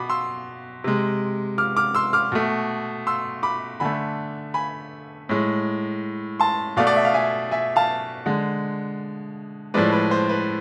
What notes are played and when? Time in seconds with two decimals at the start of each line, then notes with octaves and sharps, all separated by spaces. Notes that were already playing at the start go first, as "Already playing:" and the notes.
Already playing: B2 B5 D6
0.10 C6 E6
0.84 C3 G#3
1.58 D6 F6
1.77 D6 F6
1.95 C6 E6
2.13 D6 F6
2.32 B2 A3
3.07 C6 E6
3.43 B5 D6
3.80 D3 A3 G#5 B5
4.54 G#5 B5
5.29 A2 G#3
6.40 A5 C6
6.77 B2 A3 D5 F5
6.87 D5
6.96 E5
7.05 F5
7.14 E5 G#5
7.51 E5 G#5
7.76 F5 A5
8.26 D3 G#3
9.74 A2 F3 G#3 B4 D5
9.93 B4
10.11 C5
10.29 B4